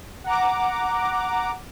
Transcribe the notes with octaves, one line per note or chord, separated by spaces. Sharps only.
F#5 A#5 D6